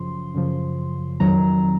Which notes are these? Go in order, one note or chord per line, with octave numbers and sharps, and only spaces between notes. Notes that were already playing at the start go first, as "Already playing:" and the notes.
Already playing: F#2 C#3 F3 C6
F#2 C#3 F3
F2 D#3 F#3 A#5